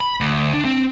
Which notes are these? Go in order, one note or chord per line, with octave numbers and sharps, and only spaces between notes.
B5
D2
D4
C4